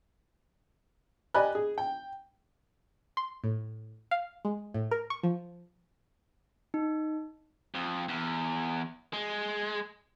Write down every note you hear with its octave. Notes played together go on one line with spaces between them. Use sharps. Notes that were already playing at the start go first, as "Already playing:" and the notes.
G4 D5 D#5 G#5 B5 F#6
G#4
G5
C6
A2
F5
G#3
A2
A#4
C#6
F3
D#4
F2
E2
G#3